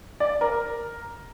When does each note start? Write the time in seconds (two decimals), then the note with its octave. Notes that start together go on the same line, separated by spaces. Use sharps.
0.20 D5
0.41 A#4